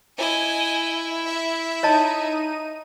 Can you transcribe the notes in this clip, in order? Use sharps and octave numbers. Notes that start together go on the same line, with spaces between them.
E4 D#5 G#5
E5
D#4 C#5 D#5 A5 D#7